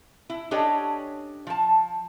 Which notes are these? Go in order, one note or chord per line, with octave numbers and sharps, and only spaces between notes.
E4
C#4 D4 G4 A4 C#5 D#5
F3 A5